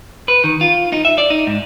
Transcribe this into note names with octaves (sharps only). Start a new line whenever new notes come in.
B4
D#3
F4
D#4
E5
D5
D#4
G#2